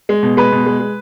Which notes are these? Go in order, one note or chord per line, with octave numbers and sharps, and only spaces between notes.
G#3
B2
G#3 B4
B2
G#3
G#3